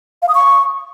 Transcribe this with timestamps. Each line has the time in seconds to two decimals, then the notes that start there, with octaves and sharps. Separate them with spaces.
0.22 F5
0.29 D#6
0.35 C#6